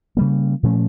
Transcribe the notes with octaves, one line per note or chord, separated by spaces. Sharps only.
C#3 G3 A#3
A#2 F3 A3 C#4